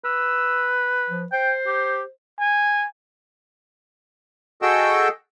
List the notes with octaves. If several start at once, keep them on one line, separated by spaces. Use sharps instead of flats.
B4 E6
F3
C5 G5
G4
G#5
F#4 G#4 A4 D#5 G5 E6